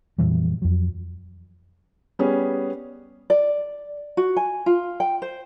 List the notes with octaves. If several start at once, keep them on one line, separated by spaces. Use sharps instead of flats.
F2 A#2 E3 G3
F2 F#3
G3 B3 C#4 G#4
D5
F#4
G#5
F4
G5
C5